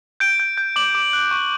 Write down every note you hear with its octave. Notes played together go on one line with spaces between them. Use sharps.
G6 D7
G6
G6
D6 F#7
D6
F#6
C#6